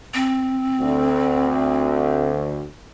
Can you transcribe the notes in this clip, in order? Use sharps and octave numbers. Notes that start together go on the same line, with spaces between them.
C4
D2